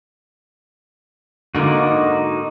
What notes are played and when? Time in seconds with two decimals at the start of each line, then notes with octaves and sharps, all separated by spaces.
1.55 G#2 D3 A#3 D#4 F#4